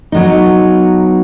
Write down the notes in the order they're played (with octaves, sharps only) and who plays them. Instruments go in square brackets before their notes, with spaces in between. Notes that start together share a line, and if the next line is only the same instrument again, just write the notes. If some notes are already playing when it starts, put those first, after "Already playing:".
[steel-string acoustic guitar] F#3 B3 D#4